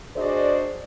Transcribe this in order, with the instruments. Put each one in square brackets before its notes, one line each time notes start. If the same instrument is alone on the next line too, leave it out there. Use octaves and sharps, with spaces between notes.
[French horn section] D4 F#4 G#4 C5 D5 D#5